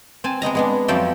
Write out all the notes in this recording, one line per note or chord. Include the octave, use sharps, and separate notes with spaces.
C4 G#5 A5
G#3 B3 D#5 A#5
G#3 B3 D4
F2 F3 F#3 D5 E5 G5